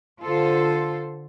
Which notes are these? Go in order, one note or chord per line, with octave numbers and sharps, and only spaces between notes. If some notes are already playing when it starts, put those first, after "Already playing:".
D3 F4 A4 C5